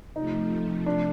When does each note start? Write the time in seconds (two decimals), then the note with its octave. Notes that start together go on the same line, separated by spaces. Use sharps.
0.16 C3 F3 A3 D#4
0.86 D4